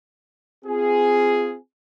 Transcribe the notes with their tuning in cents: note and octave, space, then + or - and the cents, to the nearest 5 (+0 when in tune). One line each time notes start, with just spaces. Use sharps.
C4 -20 F4 -10 G#4 +0